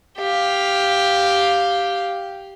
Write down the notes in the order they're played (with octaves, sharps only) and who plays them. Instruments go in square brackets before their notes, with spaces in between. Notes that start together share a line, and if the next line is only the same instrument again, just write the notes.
[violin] G4 F5